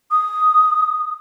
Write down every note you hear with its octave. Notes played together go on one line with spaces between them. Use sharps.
D#6